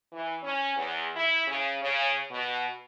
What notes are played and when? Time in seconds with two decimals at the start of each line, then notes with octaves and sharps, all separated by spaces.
0.13 E3
0.43 C#4
0.77 E2
1.16 E4
1.48 C#3
1.82 C#3
2.30 B2